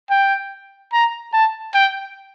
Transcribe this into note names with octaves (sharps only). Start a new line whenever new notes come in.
G5
A#5
A5
G5